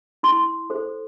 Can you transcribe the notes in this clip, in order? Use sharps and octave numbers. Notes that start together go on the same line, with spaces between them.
E4 C6
A4 C5